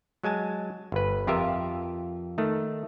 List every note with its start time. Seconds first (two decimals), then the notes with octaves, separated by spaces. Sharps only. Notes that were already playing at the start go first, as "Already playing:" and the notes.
0.24 F#3 G#3 G#5 A5
0.92 G1 B4
1.27 F2 F4 G4 A#4 E5
2.38 D#3 A3